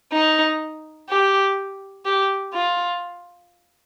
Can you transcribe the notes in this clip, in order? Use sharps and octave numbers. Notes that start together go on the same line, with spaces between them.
D#4
G4
G4
F4